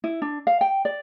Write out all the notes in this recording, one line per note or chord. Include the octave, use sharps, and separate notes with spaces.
E4
D4
F5
G5
D5